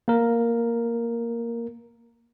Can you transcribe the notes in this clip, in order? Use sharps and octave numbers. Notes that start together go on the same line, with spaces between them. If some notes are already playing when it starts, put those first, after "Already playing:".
A#3 A#4